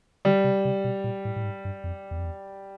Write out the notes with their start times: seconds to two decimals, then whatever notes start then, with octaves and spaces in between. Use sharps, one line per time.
0.25 D3 G3
0.44 C3
0.65 C3
0.84 B2
1.04 A#2
1.25 A2
1.36 A2
1.44 G#2
1.65 G2
1.84 F2
2.11 E2
2.18 F2
2.25 E2